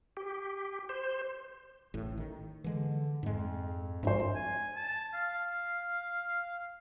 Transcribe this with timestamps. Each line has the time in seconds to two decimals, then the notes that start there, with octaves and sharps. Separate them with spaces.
0.17 G4
0.89 C5
1.94 A1 A2
2.18 D#3
2.64 D3 E3 G#3
3.23 F2 G#2 G#3
4.03 G#1 G2 F3 D4 C5
4.35 G#5
4.75 A5
5.14 F5